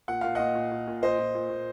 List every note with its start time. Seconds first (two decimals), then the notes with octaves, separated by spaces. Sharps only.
0.08 A#2 F#5
0.21 A#2 F5
0.35 A#2 D#5 F#5
0.55 A#2
0.71 A#2
0.87 A#2
1.02 A#2 C5 D#5
1.19 A#2
1.35 A#2
1.50 A#2